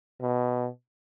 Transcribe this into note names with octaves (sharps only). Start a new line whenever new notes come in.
B2